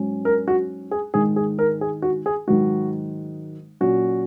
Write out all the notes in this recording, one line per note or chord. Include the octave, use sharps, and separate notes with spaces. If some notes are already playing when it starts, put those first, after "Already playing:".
Already playing: G#2 F#3 C#4
A#4
F#4
G#4
G#2 D#3 G#3 G#4
G#4
A#4
G#4
F#4
G#4
G#2 D#3 F#3 F#4
A#2 F#3 C#4 F#4